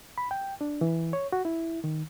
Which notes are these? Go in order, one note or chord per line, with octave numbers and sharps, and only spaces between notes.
B5
G5
D4
E3
C#5
F#4
E4
D#3